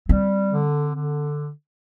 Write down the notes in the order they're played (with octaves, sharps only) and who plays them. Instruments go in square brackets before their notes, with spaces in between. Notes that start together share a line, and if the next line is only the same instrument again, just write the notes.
[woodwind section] G3 [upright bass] C4
[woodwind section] D3
D3